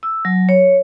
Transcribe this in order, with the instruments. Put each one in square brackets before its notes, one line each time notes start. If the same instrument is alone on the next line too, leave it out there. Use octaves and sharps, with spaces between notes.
[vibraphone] E6
F#3
C#5